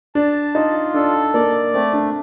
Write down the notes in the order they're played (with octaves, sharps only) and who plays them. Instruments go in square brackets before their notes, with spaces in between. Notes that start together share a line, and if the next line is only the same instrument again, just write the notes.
[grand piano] D4 [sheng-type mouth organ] A5
[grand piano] D#4 [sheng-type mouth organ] F4
[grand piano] D4 [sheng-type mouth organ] A4
[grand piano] A#3 [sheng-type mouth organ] D5
[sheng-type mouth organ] A3 [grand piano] C4
[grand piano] D4